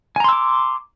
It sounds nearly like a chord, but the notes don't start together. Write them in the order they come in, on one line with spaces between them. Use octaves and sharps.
G#5 A#5 C6 E6 D6